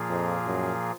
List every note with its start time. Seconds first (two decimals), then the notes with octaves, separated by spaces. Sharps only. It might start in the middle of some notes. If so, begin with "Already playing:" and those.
Already playing: A#2 F3 A#3 F4 G#4
0.10 F2
0.46 F#2